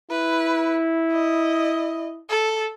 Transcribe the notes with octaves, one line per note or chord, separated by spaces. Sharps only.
E4 B4
D#5
A4